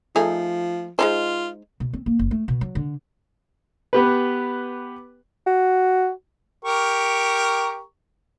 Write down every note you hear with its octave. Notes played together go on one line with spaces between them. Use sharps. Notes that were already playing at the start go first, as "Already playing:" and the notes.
F3 A3 D#4 G#4
G#3 D#4 F4 C5
B2
C4
A#3
F#1
A3
B2
F#3
D3
B3 G4 B4
F#4
G4 A#4 C#6